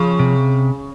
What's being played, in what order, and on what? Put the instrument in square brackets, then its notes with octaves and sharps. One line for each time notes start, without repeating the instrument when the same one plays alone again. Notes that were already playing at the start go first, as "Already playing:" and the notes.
Already playing: [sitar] C#3 [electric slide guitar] F3
[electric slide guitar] C3